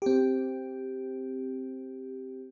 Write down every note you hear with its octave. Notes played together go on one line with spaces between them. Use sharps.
C4 G4